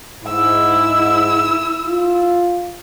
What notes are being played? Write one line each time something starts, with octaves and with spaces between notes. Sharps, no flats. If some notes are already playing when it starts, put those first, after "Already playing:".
G#2 E4 E6
F4